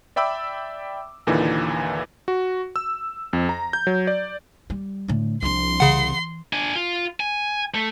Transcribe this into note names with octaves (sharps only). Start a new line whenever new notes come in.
D5 E5 G5 B5 D6 E6
D#2 A#2 D3 E3 D#4
F#4
E6
F2
A#5
G6
F#3
D5
G3
A2 D3
C2 F3 D4 C6
C#3 E3 F#5
D4 G#5
F4
G#5
A3